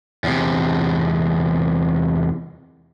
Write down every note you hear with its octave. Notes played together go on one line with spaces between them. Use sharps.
E2 C3